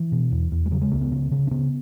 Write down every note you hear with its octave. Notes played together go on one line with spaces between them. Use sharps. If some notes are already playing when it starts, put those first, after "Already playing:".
Already playing: E3
B2
E2
E2
G#3
C#3 F#3
G#3
C#2 A#3
B3
C#3
C#3
C#4
C#3 B3